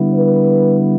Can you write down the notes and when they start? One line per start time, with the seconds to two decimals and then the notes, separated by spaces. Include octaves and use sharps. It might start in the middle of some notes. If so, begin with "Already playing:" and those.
Already playing: D3 G3 B3 E4
0.13 B4